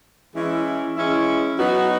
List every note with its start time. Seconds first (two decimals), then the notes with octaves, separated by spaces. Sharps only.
0.35 E3 G#3 C#4 E4
0.96 E3 G#3 C#4 E4
1.58 F#3 B3 D#4 F#4